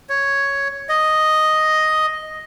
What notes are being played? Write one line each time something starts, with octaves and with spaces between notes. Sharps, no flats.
C#5
D#5